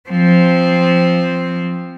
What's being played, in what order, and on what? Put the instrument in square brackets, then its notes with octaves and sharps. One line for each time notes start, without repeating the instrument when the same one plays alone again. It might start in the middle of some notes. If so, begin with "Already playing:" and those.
[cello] F3 C4